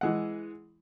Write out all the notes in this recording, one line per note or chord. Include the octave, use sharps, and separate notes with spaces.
E3 G#3 F#5